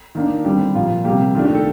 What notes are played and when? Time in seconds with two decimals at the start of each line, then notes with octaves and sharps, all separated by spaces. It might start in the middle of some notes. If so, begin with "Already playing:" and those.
0.15 D#3 A#3 D4
0.45 D3 G3 C4 G4
0.75 A#2 F3 A#3 F4
1.04 C3 G3 A#3 G4
1.35 D#3 A3 D4 F4
1.45 G4
1.55 A4